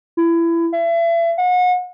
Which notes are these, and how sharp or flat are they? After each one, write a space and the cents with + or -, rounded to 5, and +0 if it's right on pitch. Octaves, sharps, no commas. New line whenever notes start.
E4 +25
E5 +35
F#5 -35